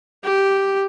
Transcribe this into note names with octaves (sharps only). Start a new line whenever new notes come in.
G4